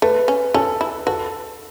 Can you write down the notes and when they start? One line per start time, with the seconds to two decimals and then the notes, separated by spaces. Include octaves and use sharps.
0.02 A3 B4
0.28 C#4
0.54 C#4 A4
0.81 E4
1.07 F#4 A4